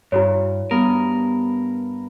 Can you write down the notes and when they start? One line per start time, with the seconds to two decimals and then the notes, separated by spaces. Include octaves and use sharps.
0.12 G2 E4 F#4 C#5
0.71 G2 B3 A#4 D#6